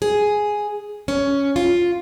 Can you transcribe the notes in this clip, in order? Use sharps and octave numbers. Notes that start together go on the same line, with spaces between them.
G#4
C#4
F4